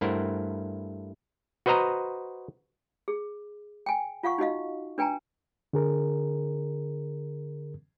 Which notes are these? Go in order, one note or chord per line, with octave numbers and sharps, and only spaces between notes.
G2 A3 E4 A#4 C5 F#5
F#4 B4 C5 D#5 A#5
G#4
G5 G#5
F4 F5 F#5 C#6
D#4 F#4 D#5 F5
D4 B4 G5 G#5 A#5
D3 G#4 A#4